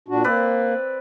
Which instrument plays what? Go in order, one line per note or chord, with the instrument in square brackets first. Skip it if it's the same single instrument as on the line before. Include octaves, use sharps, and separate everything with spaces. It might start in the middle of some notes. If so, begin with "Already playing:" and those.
[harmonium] A#2 D4 F#4
[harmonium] A#3 [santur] C4 B4 D5